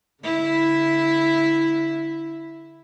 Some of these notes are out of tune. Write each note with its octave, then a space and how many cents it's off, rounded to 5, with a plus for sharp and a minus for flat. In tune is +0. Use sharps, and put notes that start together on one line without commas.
D3 -25 E4 +0